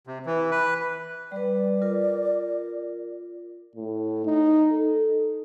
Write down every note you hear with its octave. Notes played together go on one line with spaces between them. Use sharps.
C3
E3
B4
G3 B4 D5
F4 A#4
A2
D#4
A4